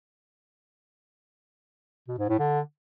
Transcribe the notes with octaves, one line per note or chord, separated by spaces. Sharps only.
B2
G#2
A2
D3